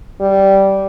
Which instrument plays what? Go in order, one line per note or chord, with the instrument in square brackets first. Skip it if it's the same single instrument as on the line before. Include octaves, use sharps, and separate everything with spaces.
[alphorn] G3